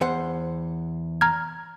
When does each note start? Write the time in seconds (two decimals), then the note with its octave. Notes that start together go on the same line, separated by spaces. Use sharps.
0.01 E2 C5 F#5
1.21 A#5 F6 G#6